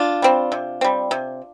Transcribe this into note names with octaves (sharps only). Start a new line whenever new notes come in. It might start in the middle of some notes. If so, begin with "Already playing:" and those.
Already playing: D4 F4
G3 C4
C3
G3 C4
C3